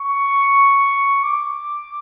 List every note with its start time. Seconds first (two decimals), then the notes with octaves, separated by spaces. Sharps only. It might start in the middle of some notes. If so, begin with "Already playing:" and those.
Already playing: C#6
1.23 D6